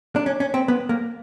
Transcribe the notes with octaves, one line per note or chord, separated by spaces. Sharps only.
D4
C#4
C#4
C4
B3
A#3